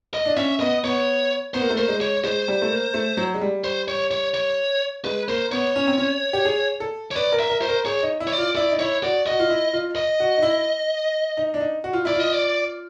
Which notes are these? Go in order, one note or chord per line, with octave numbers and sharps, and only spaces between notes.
D#5
D4
C#4 E5
B3 D#5
B3 C#5
B3 C5
A#3
A3
A#3 C5
G#3
C#5
G#3 C5
G3
A3
A#3
A3
F#3
G#3
G3
C5
C#5
C#5
C#5
G#3 B4
A#3 C5
B3 C#5
C#4
C4
C#4
G4
G#4
A4
C#5
B4 D5
A#4
E5
A#4
C5
A#4
G#4 C#5
D#4
E4
C#5
D5
F4
E4 D5
D#4
E4 C#5
F#4 D5
F#4 D#5
F4
E4
F4
D#5
F#4
D#4
E4
D#4
D4
D#4
F#4
F4
E4 D5
F4 D#5
D5